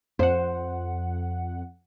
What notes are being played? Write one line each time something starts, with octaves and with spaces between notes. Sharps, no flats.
F2 C5 F#5